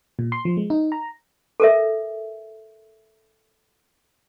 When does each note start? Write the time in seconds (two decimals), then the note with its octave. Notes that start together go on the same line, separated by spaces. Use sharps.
0.19 A#2
0.32 C6
0.45 F3
0.57 G#3
0.70 D#4
0.92 A#5
1.60 A4 A#4 E5